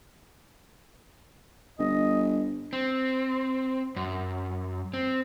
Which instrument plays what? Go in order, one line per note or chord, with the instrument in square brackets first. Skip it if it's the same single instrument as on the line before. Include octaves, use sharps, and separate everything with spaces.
[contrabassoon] G1 [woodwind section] D#5
[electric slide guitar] C4
F#2
C4